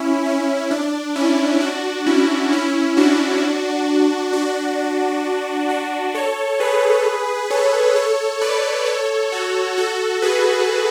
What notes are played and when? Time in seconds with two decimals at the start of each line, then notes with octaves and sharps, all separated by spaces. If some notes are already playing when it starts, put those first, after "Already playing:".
Already playing: C#4 E4
0.26 C#4
0.71 D4
1.16 C#4 E4
1.61 D4 F#4
2.06 C#4 E4
2.52 C#4 E4
2.97 D4 F#4
4.33 D4 F#4
5.69 D4 F#4
6.15 A4 C#5
6.60 G#4 B4
7.50 A4 C#5
7.96 A4 C#5
8.41 B4 D5
8.86 A4 C#5
9.32 F#4 A4
9.77 F#4 A4
10.22 G#4 B4